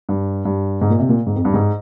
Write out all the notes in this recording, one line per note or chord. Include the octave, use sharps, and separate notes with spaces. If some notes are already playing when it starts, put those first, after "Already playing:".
G2
G2
G#2
A#2
C3
A#2
G#2
F2
G2
G#2